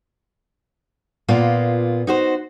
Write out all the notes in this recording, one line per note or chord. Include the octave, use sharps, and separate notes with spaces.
A#2 A#3 B3 F4
D#4 F#4 C5